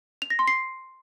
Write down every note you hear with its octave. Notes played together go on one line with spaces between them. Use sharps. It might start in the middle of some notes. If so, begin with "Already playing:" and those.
F7
A#6
C6
C7